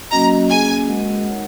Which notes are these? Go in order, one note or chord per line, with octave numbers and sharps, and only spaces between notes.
F#3 A#3 C#4 F#4 D#5 A#5
A#3 C#4 G#4 G#5
G#3 F#4 A#4 D#5 F#5
D#4 A#4 C#5 F#5